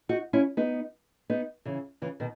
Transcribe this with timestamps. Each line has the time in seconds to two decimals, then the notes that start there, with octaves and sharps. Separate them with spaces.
0.09 D#4 F#4
0.33 C#4 E4
0.57 B3 D#4
1.30 B3 D#4
1.65 C#3 E3
2.02 C#3 E3
2.20 B2 D#3